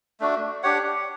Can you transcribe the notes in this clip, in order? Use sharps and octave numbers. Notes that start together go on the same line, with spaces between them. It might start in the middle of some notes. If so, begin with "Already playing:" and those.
A3 D4 F#4
D4 G4 C#5 F#5